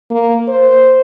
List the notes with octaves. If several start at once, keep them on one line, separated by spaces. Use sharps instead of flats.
A#3
C5